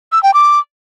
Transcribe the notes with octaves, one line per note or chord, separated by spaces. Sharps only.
E6
G5
D6